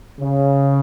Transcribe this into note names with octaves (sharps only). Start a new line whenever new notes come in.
C#3